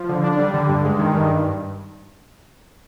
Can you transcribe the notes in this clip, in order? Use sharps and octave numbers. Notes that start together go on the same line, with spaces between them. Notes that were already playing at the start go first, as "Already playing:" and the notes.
Already playing: F3
D3
D4
G3
D3
G2
G#3
D#3
G2